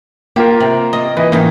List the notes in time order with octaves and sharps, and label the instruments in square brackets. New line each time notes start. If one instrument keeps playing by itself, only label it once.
[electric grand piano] A#3 F4 A#4 [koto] G4
[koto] C3
D#5
[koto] E3 [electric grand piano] B4 D#5
[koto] A2 E3 D#4 [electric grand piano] A#3